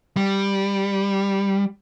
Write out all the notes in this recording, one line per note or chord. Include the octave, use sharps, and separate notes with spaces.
G3